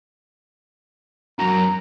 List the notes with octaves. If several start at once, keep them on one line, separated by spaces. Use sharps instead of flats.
F#2 A#5